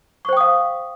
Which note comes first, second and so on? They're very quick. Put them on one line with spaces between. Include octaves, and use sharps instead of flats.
C#6 C5 G5 D#6 F5